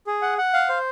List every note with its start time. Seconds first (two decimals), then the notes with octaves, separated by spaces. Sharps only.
0.07 G#4
0.22 F#5
0.38 F#5
0.53 F5
0.69 C5